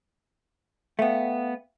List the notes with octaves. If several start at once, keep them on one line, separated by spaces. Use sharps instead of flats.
A3 B3 E5 F5 G5